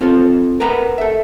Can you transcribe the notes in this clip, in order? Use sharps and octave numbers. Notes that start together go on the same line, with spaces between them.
C4 F4 A4 C5
A#4 B4 F#5 A#5 B5
A4 E5